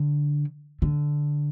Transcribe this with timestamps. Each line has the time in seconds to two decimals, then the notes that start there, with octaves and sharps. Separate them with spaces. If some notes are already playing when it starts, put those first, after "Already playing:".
Already playing: D3
0.82 D3